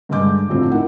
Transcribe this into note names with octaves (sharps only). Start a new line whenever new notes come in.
G2 D3 G#3 D#5 D6 G6
F1 A2 D3 C4 F4
D#4 E4 A#4 F#5